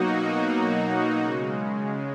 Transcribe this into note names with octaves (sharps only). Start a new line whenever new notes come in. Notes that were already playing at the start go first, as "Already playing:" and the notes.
Already playing: B2 F#3 A#3 D#4 F#4
C#3 G#3